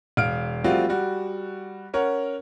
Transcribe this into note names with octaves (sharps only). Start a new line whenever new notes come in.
E1 F5 F6 D7
F3 G3 A3 C4 F4 F#4
G3 F#4
C#4 A#4 C#5 F#5